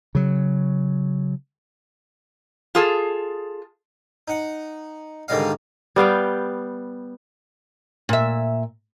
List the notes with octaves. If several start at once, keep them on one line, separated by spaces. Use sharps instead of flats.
C#3 F#3
F4 G#4 A4
D#4 F#5
G#2 D3 D#3 G3 D#5 F5
G3 B3 F5 G5
A#2 E5